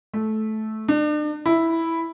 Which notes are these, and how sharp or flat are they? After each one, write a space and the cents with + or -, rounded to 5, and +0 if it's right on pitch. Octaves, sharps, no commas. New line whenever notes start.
A3 -15
D4 +40
E4 -5